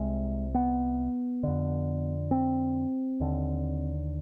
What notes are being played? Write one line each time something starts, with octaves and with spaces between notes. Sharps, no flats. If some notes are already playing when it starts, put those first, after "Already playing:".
Already playing: C2 C3 G#3
B3
F2 D3
C4
D#2 D3